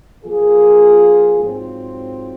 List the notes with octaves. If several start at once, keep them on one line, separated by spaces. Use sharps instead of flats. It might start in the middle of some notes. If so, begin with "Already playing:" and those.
F3 A#3 F4 G#4
G#2 F#3 C4 F4